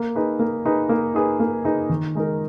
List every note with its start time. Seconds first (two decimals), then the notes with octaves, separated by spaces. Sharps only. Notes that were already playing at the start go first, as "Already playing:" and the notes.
Already playing: A#3
0.16 D#4 G#4 B4
0.39 A#3
0.65 D#4 G#4 B4
0.89 A#3
1.14 D#4 G#4 B4
1.40 A#3
1.65 D#4 G#4 B4
1.90 D#3
2.15 G#3 D#4 A#4